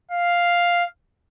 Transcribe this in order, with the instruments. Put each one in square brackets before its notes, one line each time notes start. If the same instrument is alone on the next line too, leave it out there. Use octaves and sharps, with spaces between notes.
[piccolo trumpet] F5